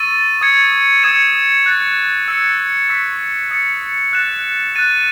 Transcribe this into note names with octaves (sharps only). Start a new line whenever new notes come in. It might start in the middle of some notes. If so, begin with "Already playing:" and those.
Already playing: C#6 E6 A6 D#7
D#6 G#6 C#7
D#6 G#6 C#7 E7
F#6 A6 C#7
E6 G#6 C#7
C#6 E6 B6
D#6 A6 C#7
F#6 A6 E7
F#6 A6 D#7